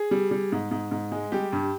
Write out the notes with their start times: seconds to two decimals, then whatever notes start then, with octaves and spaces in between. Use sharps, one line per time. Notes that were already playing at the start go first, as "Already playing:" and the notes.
Already playing: G#4
0.11 G3
0.31 G3
0.52 G#2
0.71 G#2
0.91 G#2
1.12 G#3
1.32 G3 G4
1.53 G2